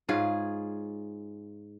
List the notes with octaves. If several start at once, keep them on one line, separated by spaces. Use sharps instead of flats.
G#2 F4 G#4 C#5